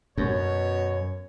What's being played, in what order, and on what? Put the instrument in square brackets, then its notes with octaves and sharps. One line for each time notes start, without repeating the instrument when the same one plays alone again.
[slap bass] F#2 [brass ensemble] B2 C#5